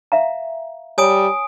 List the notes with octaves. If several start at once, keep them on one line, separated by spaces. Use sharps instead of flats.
E5 F5 A#5
G3 C#5 G#5 A#5 D#6 D7